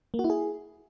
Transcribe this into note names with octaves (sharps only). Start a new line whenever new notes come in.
A#3
F#4
E4
G#4